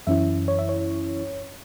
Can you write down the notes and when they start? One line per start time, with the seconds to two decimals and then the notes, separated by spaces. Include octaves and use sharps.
0.07 F#2 E3 C#4 E4 E5
0.48 C#5
0.59 E5
0.69 C#5